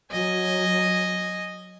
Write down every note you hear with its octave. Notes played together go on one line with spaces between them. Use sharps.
F#3 D#5 G#5